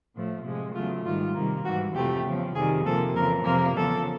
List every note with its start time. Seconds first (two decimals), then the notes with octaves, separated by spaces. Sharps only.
0.14 A2 F3 A3
0.44 C3 F3 G#3
0.74 E2 C#3 F#3 A3 F4
1.04 G#2 D#3 G3 F4
1.34 C3 D#3 G3 A#3
1.64 G#2 E3 G3 F#4
1.94 F2 C3 F3 A3 G4
2.25 E2 C#3 F3
2.55 F2 C3 D#3 G3 G#4
2.85 C3 F3 A#3 A4
3.15 F2 C#3 E3 A#4
3.45 F2 C3 F3 A#3 A#4
3.75 E2 C#3 F3 A4